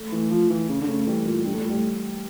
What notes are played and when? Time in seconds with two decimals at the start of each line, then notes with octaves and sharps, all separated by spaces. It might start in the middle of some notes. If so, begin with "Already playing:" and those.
Already playing: A3
0.12 E3 A3
0.31 F3
0.50 E3
0.69 C#3
0.81 D3
0.87 C#3 A3
0.99 A3
1.07 E3 G3
1.25 A#2 E3
1.45 G2 G3
1.53 A2 A3
1.57 G3
1.63 A#2
1.69 G3
1.73 A2